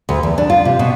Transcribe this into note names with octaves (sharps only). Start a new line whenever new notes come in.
D2
E2
D4
F4
C3
B2